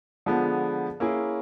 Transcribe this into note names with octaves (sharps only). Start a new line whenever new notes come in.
D3 F3 G#3 B3
A#3 C#4 E4 G#4